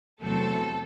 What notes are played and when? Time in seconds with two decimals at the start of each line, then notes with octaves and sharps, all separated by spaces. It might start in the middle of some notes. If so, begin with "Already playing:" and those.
0.22 E2 C3 F#3 A3 C4 A4